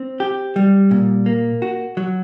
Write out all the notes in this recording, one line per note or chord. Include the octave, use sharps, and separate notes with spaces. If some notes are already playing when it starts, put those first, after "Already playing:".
Already playing: C4
G4
G3
A#2
A#3
F#4
F#3